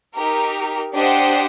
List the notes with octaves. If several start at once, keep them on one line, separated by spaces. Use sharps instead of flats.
D#4 G4 A#4
D4 G4 C5 D#5 F#5